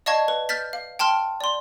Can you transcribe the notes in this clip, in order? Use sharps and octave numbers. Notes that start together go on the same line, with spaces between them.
D5 D#5 F5 A5 C#6 G#6
B4
F6 G6 A6 B6
F5
G5 A5 C6 F6
D5 C6